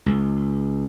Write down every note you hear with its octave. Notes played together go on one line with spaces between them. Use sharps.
C#2